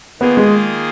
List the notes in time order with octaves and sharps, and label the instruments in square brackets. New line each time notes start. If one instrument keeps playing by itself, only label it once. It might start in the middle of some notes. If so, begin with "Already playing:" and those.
[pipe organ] D#3 A#3 F4 G#4 [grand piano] B3
[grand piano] G#3